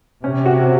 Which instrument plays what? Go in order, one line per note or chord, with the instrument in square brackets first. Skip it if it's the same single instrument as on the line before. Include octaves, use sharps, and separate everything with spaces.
[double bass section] C3 [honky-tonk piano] C#4
[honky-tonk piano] F#4